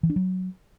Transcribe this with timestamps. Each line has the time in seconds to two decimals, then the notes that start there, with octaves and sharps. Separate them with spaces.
0.03 E3
0.10 D4
0.16 F#3